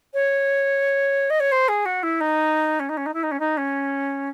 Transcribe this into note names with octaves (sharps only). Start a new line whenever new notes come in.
C#5
D#5
C#5
C5
G#4
F#4
E4
D#4
C#4
D#4
C#4
D#4
E4
D#4
C#4
D#4
C#4